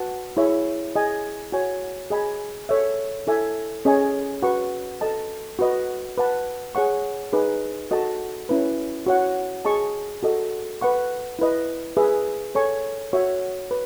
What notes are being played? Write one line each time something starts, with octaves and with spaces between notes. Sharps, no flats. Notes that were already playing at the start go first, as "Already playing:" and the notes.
Already playing: F#4 B4 F#5 A5
E4 G#4 C#5 E5
G#4 D#5 G#5
F#4 C#5 G#5
G#4 D#5 G#5 B5
A4 C#5 E5
E4 A4 E5 G#5
C#4 G#4 D#5 G#5 C#6
F#4 B4 F#5 C#6
A4 D#5 A5
F#4 B4 D#5
B4 F#5 A5
G#4 C#5 F#5 C#6
D#4 G#4 B4
F#4 A4 D#5 A5
C#4 E4 B4
F#4 C#5 F#5
G#4 D#5 A5 C#6
F#4 A4 D#5
B4 F#5 C#6
E4 B4 D#5
G#4 B4 E5
A4 C#5 G#5 C#6
F#4 C#5 E5
B4